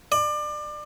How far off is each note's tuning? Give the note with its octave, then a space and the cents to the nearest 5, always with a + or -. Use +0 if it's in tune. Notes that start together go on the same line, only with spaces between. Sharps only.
D5 +30